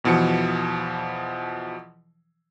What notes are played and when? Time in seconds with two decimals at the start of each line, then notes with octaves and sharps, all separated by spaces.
0.04 E2 B2 E3 F3 C#7